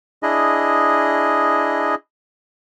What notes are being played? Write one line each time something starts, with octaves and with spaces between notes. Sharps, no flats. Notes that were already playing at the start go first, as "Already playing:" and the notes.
D4 E4 G#4 D#5